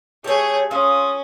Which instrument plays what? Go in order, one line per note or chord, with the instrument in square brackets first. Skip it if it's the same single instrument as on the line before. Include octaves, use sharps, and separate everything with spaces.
[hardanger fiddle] A3 G#4 [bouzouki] G4 C#5
[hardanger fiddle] C#4 [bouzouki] F4 [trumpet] D#6